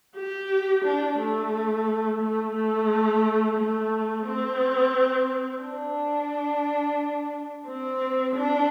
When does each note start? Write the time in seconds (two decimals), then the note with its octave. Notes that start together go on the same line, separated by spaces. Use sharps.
0.16 G4
0.85 D4
1.19 A3
2.21 A3
2.55 A3
3.58 A3
4.26 C4
5.63 D4
7.67 C4
8.35 D4